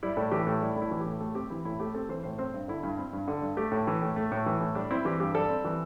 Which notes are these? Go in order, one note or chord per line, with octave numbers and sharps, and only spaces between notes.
G3 E4
A2 A4
E3 G4
A2
G3 E4
A2
E4
E3
G4
A2
A3 A4
C4 G4
E3 E4
A2 E4
A3 G4
C4 A4
E3 C5
A2 C5
C4 C5
G2
D3 E4
G2 E4
C4
G2
D3
G2
A3 G4
A2
E3
A2
A3
A2
E3
A2
G3 D4
C4 E4
E3 G4
G2 G4
G3 A4
C4
E3